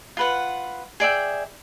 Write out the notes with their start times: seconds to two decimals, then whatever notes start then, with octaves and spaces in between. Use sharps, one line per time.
0.17 F4 B4 F#5
1.00 G#4 D5 E5 G5